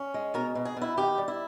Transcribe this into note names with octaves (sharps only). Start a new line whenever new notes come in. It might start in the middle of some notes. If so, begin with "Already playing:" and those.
Already playing: C#4
G#3
B2 A#4
B2
G#4
B2 E4
D#3 G4
G3
E4